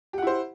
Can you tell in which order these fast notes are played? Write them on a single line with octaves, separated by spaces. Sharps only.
G4 F#5 E4 C5